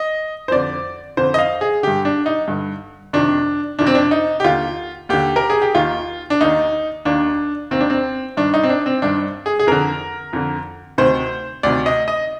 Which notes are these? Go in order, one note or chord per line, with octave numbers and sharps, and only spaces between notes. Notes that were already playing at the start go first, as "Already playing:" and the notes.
Already playing: D#5
C5
F2 D3 D5
F2 D3 C5
D#5
F5
G#4
G2 D3 G4
D4
D#4
G2 D3
F2 C3 D#3 D4
F2 C3 D#3 D4
C4
D4
D#4
G4
D#2 D3 F4
D#2 D3 G4
A#4
G#4
G4
D#2 D#3 F4
D4
D#2 D#3 D#4
D#2 D#3 D4
D#2 D#3 C4
D4
C4
G2 D#3 D4
D#4
C4
D4
C4
G2 D#3 D4
G#4
G#4
F2 D3 A#4
F2 D3
D2 C3 D#3 C5
D2 C3 D#3 D5
D#5
D#5